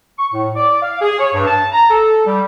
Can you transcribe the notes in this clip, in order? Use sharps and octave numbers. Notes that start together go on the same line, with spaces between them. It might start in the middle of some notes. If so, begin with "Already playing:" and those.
C#6
A2
D5
F5
G#4
C#5
G2
A5
A#5
A4
G3